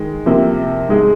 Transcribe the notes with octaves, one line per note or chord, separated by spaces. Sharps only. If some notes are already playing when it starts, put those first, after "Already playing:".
Already playing: D#3 G#3
C3 F3 A#3
G#2 G#3 D#4 G#4